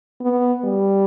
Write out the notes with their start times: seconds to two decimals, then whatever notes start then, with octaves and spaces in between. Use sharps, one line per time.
0.22 B3
0.65 G3